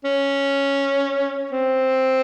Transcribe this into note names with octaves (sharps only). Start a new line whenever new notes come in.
C#4
C4